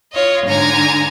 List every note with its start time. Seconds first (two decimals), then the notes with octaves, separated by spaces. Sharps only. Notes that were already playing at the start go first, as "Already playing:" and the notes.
0.12 F4 C#5 D#5
0.46 G#2 D3 G#5 A#5 A#6